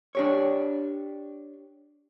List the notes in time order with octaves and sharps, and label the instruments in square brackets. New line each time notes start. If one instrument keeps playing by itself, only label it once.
[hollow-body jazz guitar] D4 G4 C#5